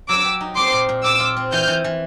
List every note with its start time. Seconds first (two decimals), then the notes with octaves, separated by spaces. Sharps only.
0.09 F#3 D6 E6
0.24 G4
0.41 D#4
0.56 C4 C6 D6
0.73 A#2
0.89 A#2
1.04 A#2 D6 E6
1.20 F4
1.37 C4
1.52 E3 F6 G6
1.68 E3
1.84 E3